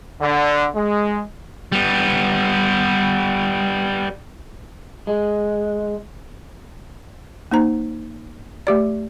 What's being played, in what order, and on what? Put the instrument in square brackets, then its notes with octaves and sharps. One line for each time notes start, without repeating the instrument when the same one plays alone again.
[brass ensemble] D3
G#3
[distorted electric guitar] G3 B3
[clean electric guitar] G#3
[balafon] A#3 D#4 C5 A#5
A3 G4 D5